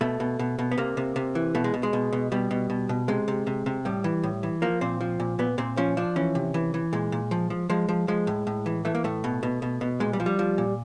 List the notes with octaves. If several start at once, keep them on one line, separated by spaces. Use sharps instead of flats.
B2 A3
B2
B2
B2
B3
C3 A#3
C3
C3
E3
B2 A3
G#3
B2
G#3
B2
B2
B2 G3
B2
B2
B2
C3 G#3
C3
C3
C3
A2 G3
E3
A2
E3
F3 A#3
A#2 C4
F3
A#2
A#2 B3
A#2 C4
F3 C#4
F3 D4
E3 C#4
C3
E3
E3
A#2 G#3
A#2
F3
F3
F3 G#3
F3
F3 G#3
A2
A2
E3
E3 A3
A#3
A2 A3
B2
B2
B2
B2
A#2 G#3
G3
F3
G3
F3
A#2